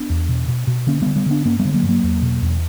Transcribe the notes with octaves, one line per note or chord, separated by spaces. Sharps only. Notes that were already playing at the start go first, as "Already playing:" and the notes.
Already playing: B3 D4
E2
B2
B2
B2
D3 A#3 C#4
D3 G3 B3
G3 B3
D3 B3 D4
G2 A#3 C#4
G3 B3
D3
F#3 A#3
G2
F#3 A#3
E2
B2
E2